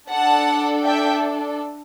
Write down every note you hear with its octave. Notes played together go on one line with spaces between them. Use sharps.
D4 A4 F#5 A5
E5 G5